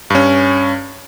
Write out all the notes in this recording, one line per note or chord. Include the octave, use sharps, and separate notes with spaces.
G2 C#4